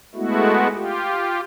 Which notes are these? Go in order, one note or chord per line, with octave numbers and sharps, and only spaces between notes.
G#3 A3 B3 E4 F#4
F4 G4